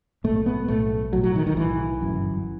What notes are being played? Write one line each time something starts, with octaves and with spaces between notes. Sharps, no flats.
B1 A2 A3
B3
B1 A2 A3
B1 A2 F#3
F#3
D#3
D#3
B1 A2 E3
G1 F#2